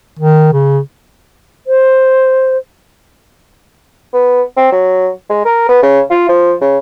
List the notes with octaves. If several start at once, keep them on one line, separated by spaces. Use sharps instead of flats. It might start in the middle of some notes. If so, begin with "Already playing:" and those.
D#3
C#3
C5
B3
C4
F#3
G#3
A#4
B3
C#3
F4
F3
C#3